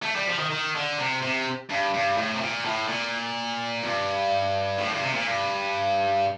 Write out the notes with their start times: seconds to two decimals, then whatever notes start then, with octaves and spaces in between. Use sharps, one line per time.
0.03 A3
0.16 G3
0.27 F3
0.39 D#3
0.50 D#3
0.75 D3
0.98 C3
1.22 C3
1.70 G2
1.94 G2
2.17 A2
2.34 C3
2.41 A#2
2.65 A2
2.88 A#2
3.83 G2
4.78 A2
4.91 G2
5.02 C3
5.14 A#2
5.26 G2